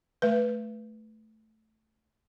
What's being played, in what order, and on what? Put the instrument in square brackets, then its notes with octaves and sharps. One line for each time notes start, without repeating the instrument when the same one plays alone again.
[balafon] A3 B4